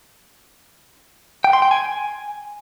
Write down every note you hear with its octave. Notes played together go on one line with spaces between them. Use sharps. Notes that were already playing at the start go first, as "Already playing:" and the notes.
G5
C6
G5
G#5